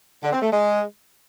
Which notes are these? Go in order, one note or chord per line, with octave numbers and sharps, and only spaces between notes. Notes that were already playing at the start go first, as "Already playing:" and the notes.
D3
C4
A3
G#3